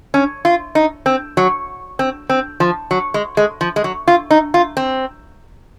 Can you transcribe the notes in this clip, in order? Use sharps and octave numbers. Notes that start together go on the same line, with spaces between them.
C#4
F4
D#4
C4
F#3
C4
C4
F3
F#3
G#3
G#3
F3
G#3
F#3
F4
D#4
F4
C4